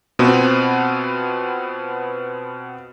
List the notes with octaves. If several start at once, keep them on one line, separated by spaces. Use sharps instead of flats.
B2 B3 C4 F4